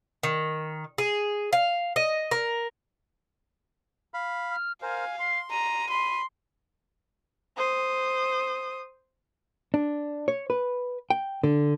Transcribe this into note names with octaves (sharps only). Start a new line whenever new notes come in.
D#3
G#4
F5
D#5
A#4
F5 B5
F6
A#4 C5 F5 G#5
C6 C7
A#5 D#7
B5 C6
C5 D#6
D4
C#5
B4
G5
D3